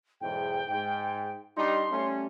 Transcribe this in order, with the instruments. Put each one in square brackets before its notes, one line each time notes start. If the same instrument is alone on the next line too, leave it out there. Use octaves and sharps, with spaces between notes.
[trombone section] B1 E2 G#2 [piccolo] G5
[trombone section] G#2
[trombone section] G3 D4 D#4 [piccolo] C6
[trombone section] G3 A3 C#4